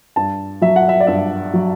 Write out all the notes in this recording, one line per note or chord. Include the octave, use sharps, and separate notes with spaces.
G2 A5
F#3 E5
F#5
E5
D5
G2 E5
F#3